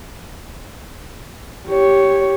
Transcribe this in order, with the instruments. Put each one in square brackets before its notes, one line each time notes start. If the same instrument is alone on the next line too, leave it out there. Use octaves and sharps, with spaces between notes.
[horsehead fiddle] G4 C#5